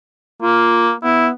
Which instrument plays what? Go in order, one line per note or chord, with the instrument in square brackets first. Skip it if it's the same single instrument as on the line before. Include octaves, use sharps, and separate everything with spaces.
[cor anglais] A#3 [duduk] F4
[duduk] B3 [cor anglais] E4